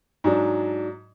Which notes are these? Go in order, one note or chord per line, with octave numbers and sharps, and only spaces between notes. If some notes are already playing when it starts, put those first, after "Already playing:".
G#2 F#3 D4